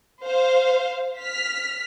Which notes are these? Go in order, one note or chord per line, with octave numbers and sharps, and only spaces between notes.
C5 F5
F6 B6